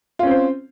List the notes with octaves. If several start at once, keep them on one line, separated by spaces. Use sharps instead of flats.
C4 C#4 F4 C5